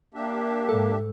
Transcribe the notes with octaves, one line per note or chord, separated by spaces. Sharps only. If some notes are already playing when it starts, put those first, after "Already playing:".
A#3 D4 G4 E5
G#2 A4